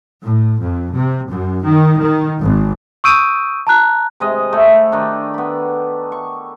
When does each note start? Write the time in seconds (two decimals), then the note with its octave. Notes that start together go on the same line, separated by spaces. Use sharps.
0.23 A2
0.61 F2
0.96 C3
1.28 F#2
1.65 D#3
2.01 D#3
2.41 G#1
3.04 C#6 D#6 E6 G6 D7 D#7
3.67 A5 A#5 F#6
4.20 C3 G#3 D#5
4.53 A3 E4 A4
4.92 D#3 D4
5.34 B3 B5
6.12 C#6